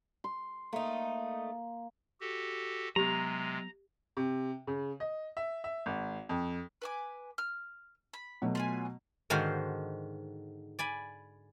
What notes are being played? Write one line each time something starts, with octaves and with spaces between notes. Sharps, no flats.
C6
A3 A#3 D#4
F#4 G4 A4
C3 F#3 G#3 B3 G4 A#5
C3
C#3
D#5
E5
E5
G#1
F2
B4 G#5 D6
F6
B5
B2 F#3 A3
F4 B4 G#5
G#2 D3 D#3 F#4 C5 F5
D5 G#5 B5